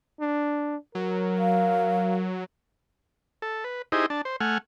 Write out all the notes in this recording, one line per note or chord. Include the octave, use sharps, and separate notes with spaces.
D4
F#3 A#4
F5
A4
B4
D#4 E4 G4 G#4 C5 D#5
D4 A5
C5
A3 F#5 G#5 F6